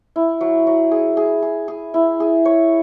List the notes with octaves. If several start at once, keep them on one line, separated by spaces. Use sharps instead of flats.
E4
F#3
F#3
G#4
G#4
G#4
G#4
E4
G#4
C#5